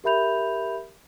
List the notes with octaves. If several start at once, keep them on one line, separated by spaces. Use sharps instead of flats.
G4 A#4 E5 B5 G6 F7